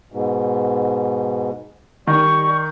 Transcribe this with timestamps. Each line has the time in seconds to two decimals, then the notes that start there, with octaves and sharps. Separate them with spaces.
0.12 G#2 B2
2.07 D#3 G3 C#6